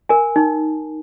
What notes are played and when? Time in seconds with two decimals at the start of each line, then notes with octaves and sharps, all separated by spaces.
0.09 A#4 G#5
0.36 D#4